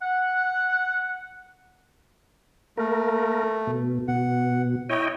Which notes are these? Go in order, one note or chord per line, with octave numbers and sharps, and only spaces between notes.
F#5
A3 A#3 A#4
B2
B2 F#5
E4 C#5 D#5 G5